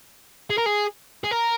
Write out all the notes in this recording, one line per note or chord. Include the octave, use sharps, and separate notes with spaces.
G#4
A#4
G#4
G#4
A#4